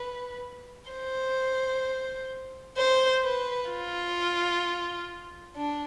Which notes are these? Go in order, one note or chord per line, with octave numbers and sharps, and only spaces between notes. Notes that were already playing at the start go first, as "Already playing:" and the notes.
Already playing: B4
C5
C5
B4
F4
D4